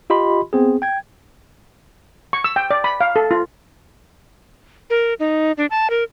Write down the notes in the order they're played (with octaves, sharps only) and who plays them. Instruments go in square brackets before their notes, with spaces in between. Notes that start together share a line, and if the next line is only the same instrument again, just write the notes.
[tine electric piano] F4 G4 D#5 B5 C6
B3 C4 G#4
G5 G#6
[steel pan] C#6
E6
G5
D5
B5
F5
A4
F4
[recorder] A#4
D#4
D4
A5
A#4